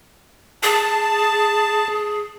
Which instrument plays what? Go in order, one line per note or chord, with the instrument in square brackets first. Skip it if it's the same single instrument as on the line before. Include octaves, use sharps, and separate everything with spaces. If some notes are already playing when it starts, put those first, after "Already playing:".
[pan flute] G#4 [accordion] A5